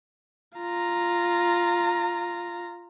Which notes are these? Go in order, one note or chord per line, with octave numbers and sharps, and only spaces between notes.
F4 A#5